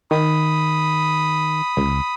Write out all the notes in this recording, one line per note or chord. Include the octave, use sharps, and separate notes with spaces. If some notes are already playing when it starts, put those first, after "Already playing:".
D#3 B5 D#6
C#2